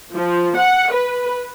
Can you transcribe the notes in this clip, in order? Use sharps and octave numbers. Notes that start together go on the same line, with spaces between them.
F3
F#5
B4